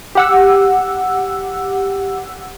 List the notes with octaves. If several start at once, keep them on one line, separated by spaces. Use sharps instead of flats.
G4 F#5 E6